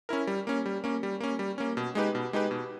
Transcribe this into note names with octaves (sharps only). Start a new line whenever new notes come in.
C#4 E4 A#4
G3
A#3 C#4
G3
A#3 C#4
G3
A#3 C#4
G3
A#3 C#4
B2
G#3 D#4 G4 B4
B2
G#3 D#4 G4 B4
B2